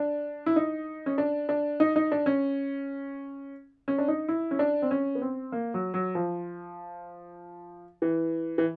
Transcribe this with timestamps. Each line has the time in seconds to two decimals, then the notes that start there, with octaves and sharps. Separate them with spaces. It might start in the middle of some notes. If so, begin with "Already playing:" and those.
Already playing: D4
0.46 E4
0.56 D#4
1.06 C#4
1.18 D4
1.49 D4
1.80 D#4
1.96 D#4
2.12 D4
2.26 C#4
3.88 C#4
3.98 D4
4.08 D#4
4.28 E4
4.51 C#4
4.59 D4
4.82 C4
4.91 C#4
5.15 B3
5.22 C4
5.52 A#3
5.74 F#3
5.94 F#3
6.15 F3
8.02 E3
8.58 E3